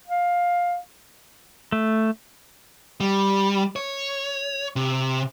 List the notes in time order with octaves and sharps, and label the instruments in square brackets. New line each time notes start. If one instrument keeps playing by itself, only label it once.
[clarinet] F5
[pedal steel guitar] A3
[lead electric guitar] G3
C#5
C3